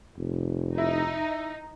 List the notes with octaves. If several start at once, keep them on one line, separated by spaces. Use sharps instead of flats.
F1
D#4 E4